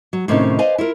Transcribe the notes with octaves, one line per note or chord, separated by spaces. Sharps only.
F#3
A2 C3 D#3 C#4 D#4 C5
B4 C5 D5 D#5 F5 G#5
E4 F4 A#4